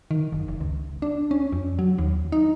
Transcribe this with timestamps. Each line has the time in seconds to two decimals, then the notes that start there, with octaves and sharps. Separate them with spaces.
0.11 D#3
0.32 F#1
0.48 F1
0.61 C#2
1.02 D4
1.31 C#4
1.52 F2
1.79 F#3
1.98 D#2
2.32 D#4